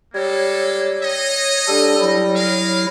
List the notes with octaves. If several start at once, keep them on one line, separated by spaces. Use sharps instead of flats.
G3 G#3 A#3 A4 C#5
D#4 D#5
G3 D4 A4
F#3 E4
G#3 A#4 F5